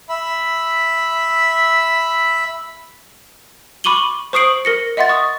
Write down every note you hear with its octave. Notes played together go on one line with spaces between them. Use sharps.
E5 B5
B5 C#6 D6 D#7 F#7 G7
C5 C#6 D#6 C7 D7 F#7
A#4 A#6 C#7
D#5 E5 F#5 C6 A6
C#6 D#6